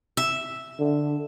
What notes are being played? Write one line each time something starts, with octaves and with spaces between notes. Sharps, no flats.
E5
D3